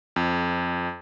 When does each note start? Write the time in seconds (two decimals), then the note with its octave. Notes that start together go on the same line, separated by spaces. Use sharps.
0.16 F2